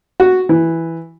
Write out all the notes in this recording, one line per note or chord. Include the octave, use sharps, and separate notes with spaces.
F#4
E3